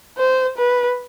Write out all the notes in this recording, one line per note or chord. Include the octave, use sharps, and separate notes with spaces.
C5
B4